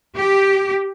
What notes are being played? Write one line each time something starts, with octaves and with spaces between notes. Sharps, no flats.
G4